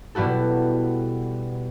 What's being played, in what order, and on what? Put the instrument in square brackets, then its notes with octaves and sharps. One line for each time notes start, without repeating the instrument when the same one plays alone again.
[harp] B2 G3 E4 F#4 A4